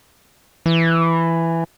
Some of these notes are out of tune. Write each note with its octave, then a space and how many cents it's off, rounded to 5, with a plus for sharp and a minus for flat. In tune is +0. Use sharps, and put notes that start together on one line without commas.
E3 +10